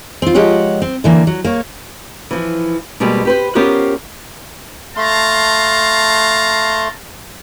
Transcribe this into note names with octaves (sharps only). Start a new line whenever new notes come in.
C4 F4
F3 G#3 G4 C#5 F#5
C4
D3 E3 A#3
F#3
A#3 C#5
E3 F3
B2 G3 G#3 A#3 C4
G4 B4 C5
B3 C#4 F4 G4 A#4 C5
A3 F5 A5 A#5 C6